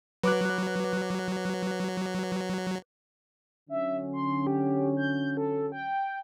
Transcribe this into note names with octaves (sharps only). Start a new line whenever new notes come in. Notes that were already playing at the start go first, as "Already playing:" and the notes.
F#3 B4 D6 F#6
D3 F#3 C#4 E5
C6
G4
G6
A4
G5